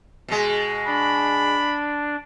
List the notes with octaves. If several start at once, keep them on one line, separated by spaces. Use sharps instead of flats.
B2 G#3
D4 B5